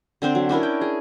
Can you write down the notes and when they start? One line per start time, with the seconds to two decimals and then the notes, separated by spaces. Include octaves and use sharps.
0.22 D3 C4 D4 C5
0.35 F#3
0.49 C#4 D4 E4 A#4
0.63 G5
0.81 G#4